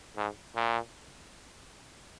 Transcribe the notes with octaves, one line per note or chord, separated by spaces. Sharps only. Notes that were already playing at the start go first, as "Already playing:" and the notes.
G#2
A#2